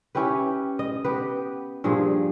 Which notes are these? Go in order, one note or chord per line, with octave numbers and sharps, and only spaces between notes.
C#4 E4 G4 B4
D#5
B3 G4 B4
G2 A#2 F3 G#4